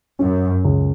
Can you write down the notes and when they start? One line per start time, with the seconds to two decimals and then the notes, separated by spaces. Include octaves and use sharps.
0.19 F#2 C#4
0.65 C#2